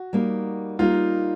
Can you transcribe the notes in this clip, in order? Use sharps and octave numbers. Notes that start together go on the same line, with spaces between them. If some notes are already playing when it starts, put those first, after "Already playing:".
Already playing: F#4
G3 A#3 D#4
G3 A#3 D#4 F4